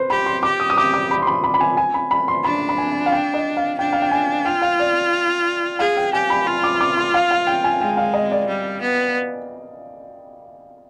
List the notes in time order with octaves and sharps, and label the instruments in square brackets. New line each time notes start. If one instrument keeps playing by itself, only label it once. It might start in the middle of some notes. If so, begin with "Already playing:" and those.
Already playing: [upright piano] B4 C5
[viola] G4 [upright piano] B5
[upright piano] C6
[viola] G4 [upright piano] D6
[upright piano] D#6
D#6
[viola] G4 [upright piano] D6
[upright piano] D6
B5
C6
B5
B5
B5
G#5
G#5
B5
B5
C6
[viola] D4 [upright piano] B5
[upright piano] B5
G#5
F5
G5
D#5
F5
[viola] D4 [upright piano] G5
[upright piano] F5
G5
G#5
[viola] F4 [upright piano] G5
[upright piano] F5
D5
[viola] G#4 [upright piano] F5
[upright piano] G5
[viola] G4 [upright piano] G#5
[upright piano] B5
[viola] F4 [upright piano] C6
[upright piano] D6
D6
C6
F5
F5
G5
G#5
[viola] G#3 [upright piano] G5
[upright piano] F5
D#5
D5
[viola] G3
B3